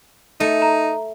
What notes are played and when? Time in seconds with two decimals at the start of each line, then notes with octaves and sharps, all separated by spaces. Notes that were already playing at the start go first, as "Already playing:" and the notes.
0.40 A3 D#4
0.62 A#5